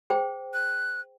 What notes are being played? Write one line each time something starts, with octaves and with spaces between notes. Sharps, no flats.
G#4 C5 G5
F#6